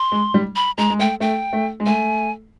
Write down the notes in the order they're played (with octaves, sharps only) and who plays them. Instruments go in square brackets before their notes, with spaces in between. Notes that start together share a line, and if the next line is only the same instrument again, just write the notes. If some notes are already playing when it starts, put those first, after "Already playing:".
Already playing: [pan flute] C6
[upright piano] G#3
G3
[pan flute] B5
[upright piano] G#3 [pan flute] A#5
[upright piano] G#3
[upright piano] A3 [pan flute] G5
[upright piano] A3 [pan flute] G5
[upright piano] A3
G#3
[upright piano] A3 [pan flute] G#5